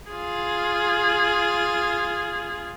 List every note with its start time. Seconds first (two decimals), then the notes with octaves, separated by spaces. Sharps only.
0.10 F4 G#4